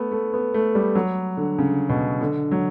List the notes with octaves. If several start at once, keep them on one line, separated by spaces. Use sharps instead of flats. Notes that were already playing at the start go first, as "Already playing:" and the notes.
Already playing: A3 B3
A3
B3
A3
G3
F#3
D3
C#3
B2
D3
F#3